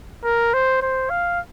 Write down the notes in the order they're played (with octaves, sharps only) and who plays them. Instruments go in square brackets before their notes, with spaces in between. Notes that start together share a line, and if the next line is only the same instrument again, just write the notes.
[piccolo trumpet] A#4
C5
C5
F5